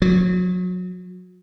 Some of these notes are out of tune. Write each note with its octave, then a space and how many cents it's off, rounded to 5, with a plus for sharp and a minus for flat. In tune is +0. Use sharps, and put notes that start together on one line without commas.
F#3 -30